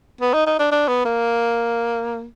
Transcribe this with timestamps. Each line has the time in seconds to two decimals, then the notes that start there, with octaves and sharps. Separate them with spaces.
0.21 B3
0.33 D#4
0.46 D#4
0.59 D4
0.71 D4
0.88 B3
1.05 A#3